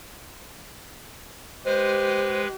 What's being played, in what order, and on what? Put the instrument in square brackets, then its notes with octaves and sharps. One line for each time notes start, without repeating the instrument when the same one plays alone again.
[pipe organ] G#3 B4 [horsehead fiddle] G4 [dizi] C5